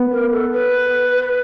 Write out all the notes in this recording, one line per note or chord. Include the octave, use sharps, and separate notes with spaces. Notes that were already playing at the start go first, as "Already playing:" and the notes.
Already playing: B3
A#4
A4
B4